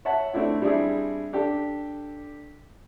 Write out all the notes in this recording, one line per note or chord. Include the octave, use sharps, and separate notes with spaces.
C#5 E5 F#5 A5
A3 C4 D4 E4
G3 C4 D4 E4 G#4
D4 G4 A4